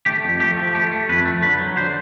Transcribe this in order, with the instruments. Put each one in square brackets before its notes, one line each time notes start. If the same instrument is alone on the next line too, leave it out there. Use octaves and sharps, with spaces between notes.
[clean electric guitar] A3 G4
F2
A3 G4
F3
A3 G4
A3
F2 B4
A3
D3 B4
F#3
D3 C5